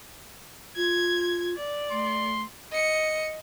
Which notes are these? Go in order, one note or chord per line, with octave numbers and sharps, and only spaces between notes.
F4 G#6
D5
A3 C6
D#5 C#7